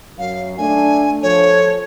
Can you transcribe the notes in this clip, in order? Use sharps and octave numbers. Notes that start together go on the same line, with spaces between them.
F#2 F#3 F5
A3 D4 G#5
F3 A4 C#5